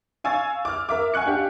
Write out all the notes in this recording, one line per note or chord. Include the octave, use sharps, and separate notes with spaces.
F5 G#5 C#6 E6 A6
D6 F6
A#4 E5 D6
F#5 G#5 C#6 F#6 C#7
D4 G4 F5